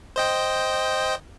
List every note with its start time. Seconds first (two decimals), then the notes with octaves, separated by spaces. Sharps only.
0.16 C5 D#5 G5